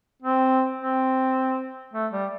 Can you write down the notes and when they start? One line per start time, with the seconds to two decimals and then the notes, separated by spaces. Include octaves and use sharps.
0.22 C4
0.79 C4
1.93 A3
2.12 G3